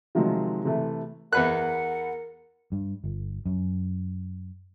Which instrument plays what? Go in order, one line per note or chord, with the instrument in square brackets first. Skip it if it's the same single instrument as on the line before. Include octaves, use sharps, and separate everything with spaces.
[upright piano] C3 D#3 F3 F#3 G#3
C3 E3 A3
[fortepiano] E2 B4 F#6 [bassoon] A#4 [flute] F#5
[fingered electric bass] G2
G1
F#2